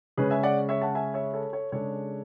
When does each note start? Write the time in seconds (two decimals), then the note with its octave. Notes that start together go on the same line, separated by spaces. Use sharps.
0.18 C#3 G#3 C#4 G#4 B4
0.30 E5 G#5
0.43 D5 F#5
0.69 C#5 E5
0.81 F#5 A5
0.95 E5 G#5
1.14 C#5 E5
1.33 A4 C#5
1.53 A4 C#5
1.72 C#3 G#3 D4 A4 C#5